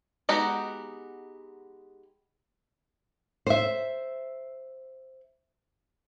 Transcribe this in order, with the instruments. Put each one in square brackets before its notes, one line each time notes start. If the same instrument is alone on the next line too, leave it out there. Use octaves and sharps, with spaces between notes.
[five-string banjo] G#3 B3 D#4 F#4 G4
[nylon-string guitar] C5 E5